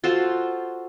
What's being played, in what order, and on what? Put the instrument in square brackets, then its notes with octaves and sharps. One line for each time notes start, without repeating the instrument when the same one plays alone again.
[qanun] F4 F#4 A4 C5